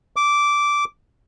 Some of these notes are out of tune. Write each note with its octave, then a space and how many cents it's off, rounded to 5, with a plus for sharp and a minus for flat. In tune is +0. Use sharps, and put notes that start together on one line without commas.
D6 -10